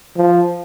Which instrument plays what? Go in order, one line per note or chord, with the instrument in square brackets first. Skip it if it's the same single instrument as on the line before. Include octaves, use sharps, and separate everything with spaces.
[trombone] F3